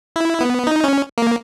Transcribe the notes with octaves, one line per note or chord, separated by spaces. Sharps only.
E4
B3
D#4
C#4
A#3